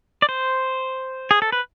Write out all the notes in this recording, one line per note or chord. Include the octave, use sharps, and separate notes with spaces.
D5
C5
G#4
A4
B4